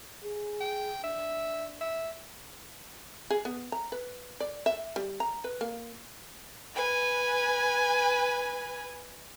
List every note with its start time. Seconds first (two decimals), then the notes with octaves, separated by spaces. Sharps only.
0.24 G#4
0.61 G5
1.04 D4 E5
1.81 E5
3.30 G#4
3.45 B3
3.72 A#5
3.92 B4
4.40 D5
4.66 E5
4.96 G3
5.20 A#5
5.44 B4
5.61 A#3
6.74 B4 G#5